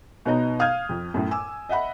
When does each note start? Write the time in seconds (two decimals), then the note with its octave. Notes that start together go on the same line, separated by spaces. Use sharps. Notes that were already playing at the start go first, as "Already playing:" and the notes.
0.25 B2 B3 D#4 C#5 D#5 A#5
0.59 F5 D#6 F6 G6 G#6
0.89 F2
1.14 F#2 A2
1.31 G#5 D6 E6
1.69 D#5 E5 F#5 B5